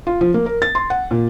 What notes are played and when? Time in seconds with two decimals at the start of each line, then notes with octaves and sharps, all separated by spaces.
0.07 F4
0.21 F3
0.34 A#3
0.46 A#4
0.62 A6
0.75 C6
0.90 F#5
1.11 A#2